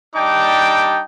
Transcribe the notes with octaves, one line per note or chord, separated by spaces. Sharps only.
G3 D4 D#4 G5 A5 D6